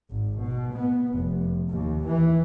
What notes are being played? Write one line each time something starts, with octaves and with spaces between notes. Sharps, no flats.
G#1
B2
B3
F1
D#2
E3